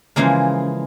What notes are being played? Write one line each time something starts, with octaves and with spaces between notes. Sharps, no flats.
C#3 E3 F3 G#3 A#3